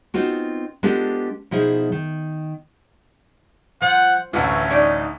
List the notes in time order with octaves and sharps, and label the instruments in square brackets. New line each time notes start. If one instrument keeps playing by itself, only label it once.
[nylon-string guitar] B3 C4 D#4 F4 F#4
G#3 B3 D4 F4 G4 A4
B2 F3 D#4 E4 G#4
D#3
[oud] F3 [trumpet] F#5
[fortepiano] A1 D2 [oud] E3 [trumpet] C#4
[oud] D#4 D5